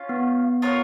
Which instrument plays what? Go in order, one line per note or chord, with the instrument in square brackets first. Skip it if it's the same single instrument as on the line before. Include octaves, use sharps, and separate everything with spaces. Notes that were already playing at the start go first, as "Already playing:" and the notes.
Already playing: [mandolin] C#4 F4 F5
[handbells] B3
[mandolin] F4 A#4 C#5 F#5